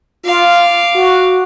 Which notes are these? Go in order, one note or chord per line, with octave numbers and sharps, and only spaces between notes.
F4 F5 D6
F#4